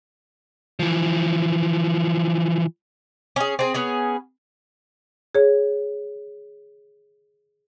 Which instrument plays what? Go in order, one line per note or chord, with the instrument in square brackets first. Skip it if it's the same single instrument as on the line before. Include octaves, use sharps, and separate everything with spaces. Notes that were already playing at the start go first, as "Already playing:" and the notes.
[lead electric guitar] E3 F3
[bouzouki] C#4 G#4
C4 G#4
B3 C#4 G#4
[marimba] G#4 C#5